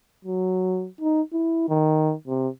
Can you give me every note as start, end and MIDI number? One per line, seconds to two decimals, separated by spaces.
0.25 0.88 54
1.01 1.22 63
1.33 1.67 64
1.69 2.13 51
2.27 2.48 48